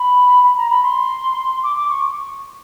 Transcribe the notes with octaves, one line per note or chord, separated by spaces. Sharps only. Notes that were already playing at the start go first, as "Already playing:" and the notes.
Already playing: B5
B5
A#5
B5
C6
D6
D6
C#6